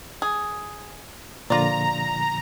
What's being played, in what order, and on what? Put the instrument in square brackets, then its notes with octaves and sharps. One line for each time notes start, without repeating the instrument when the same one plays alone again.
[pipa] G#4
[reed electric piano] A#2 D3 F3 [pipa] F4 D5 [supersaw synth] A#5